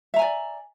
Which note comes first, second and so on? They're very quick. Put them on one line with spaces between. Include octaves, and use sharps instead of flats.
E5 A#5 G#5 D5